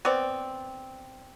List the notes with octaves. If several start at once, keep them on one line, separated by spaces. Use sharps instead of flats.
B3 C4 D5